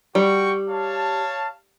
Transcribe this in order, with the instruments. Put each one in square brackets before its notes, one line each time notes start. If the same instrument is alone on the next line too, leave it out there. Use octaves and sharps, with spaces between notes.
[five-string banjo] G3 [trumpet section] F#4 G5 C#6
[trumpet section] C#5 F5 A5